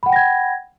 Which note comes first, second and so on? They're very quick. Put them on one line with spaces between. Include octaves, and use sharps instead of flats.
B5 F#5 G5 A#6 G#6